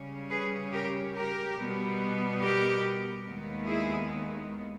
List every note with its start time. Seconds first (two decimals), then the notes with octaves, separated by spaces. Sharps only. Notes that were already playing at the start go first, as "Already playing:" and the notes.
Already playing: C#3 G3 C#4
0.30 G#4 B4
0.73 G4 A#4
1.15 G4 A#4
1.58 B2 G3 B3
2.41 G4 A#4
3.26 D#2 D#3 G#3 B3
3.68 E4 G#4